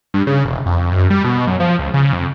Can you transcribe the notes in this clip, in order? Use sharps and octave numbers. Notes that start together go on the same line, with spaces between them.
G2
C#3
E1
F2
F#2
G3
B2
F#2
F3
C#2
C#3
F2